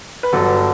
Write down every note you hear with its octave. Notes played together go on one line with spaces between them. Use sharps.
B4
G1 G2 D3 F#3 A4